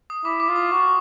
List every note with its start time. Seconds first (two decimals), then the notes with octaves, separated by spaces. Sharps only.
0.10 D#6
0.24 E4 D6
0.40 D6
0.49 F4
0.56 D#6
0.72 F#4 D6